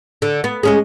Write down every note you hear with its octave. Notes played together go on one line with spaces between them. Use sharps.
D3
B3
G#3 C#4 G#4